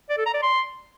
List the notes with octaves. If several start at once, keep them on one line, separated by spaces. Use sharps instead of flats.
D5
A4
A#5
D5
C6